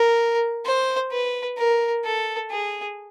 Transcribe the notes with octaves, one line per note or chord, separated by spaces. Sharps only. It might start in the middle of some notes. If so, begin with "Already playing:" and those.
Already playing: A#4
C5
B4
A#4
A4
G#4